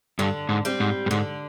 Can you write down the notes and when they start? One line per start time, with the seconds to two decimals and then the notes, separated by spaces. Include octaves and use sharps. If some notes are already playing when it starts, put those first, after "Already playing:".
0.19 G2 D3
0.49 G#2
0.65 G3 C4
0.80 G#2
1.06 G2
1.11 G#2 D3